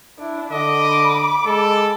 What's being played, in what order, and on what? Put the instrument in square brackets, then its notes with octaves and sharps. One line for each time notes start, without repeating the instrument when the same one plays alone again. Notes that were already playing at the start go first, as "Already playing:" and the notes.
[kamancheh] D4 E4
[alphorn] D3 [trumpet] D#5 [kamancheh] B5 D6
[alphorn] G#3 [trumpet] A4